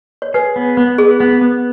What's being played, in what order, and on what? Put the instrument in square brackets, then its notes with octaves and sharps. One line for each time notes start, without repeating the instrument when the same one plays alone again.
[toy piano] C#5
[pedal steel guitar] G#4 [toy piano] B4
[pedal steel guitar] B3
B3
[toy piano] G#4 [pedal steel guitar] B4
[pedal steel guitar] B3
B3